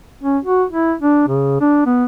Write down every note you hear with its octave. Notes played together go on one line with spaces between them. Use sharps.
C#4
F#4
E4
D4
C#3
D4
B3